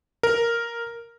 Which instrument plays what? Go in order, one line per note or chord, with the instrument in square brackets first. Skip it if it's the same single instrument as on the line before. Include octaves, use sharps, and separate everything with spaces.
[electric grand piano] A#4